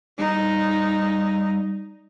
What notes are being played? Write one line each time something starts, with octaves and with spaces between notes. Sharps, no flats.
G3 D#4